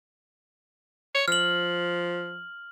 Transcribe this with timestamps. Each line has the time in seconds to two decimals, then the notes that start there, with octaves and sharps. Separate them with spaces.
1.15 C#5
1.28 F3 F6 F#7